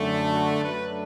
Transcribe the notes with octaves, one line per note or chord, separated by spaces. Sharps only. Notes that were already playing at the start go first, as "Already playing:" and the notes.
Already playing: F#2 D3 A3
F#4
F#2 F#3 A3 D4 B4